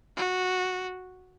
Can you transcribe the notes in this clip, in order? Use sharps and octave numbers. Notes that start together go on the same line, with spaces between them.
F#4